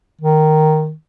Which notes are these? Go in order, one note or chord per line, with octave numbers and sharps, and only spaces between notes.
D#3